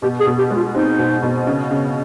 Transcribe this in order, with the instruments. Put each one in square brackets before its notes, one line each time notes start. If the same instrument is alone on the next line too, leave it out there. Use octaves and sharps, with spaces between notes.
[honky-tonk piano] B2 [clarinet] G4
[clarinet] G#4
[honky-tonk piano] B2
[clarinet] G4
[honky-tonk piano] G#3
[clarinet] F4
[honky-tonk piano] C4 [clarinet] D#4
[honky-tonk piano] B2
B2
C#3
C#3